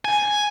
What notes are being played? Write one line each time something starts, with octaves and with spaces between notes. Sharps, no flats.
G#5